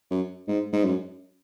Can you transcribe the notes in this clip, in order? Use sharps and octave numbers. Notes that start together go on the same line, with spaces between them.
F#2
G#2
G#2
F#2